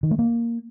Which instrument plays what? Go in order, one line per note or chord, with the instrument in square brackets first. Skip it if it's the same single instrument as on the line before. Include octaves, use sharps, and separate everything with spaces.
[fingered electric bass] D#3
A3
A#3